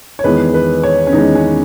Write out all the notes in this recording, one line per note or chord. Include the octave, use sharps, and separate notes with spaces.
C#5
E2 D#3 G#3 B3 B4
B4
C#5
C#4
E2 D#3 G#3 B3 D#4
C#4